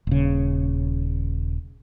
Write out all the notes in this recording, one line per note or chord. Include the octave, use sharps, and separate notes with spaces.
D#1 C#3